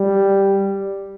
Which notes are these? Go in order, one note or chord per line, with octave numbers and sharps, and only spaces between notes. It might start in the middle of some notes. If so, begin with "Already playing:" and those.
Already playing: G3